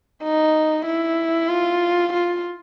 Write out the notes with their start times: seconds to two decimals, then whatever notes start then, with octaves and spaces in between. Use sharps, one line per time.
0.23 D#4
0.86 E4
1.49 F4
2.13 F4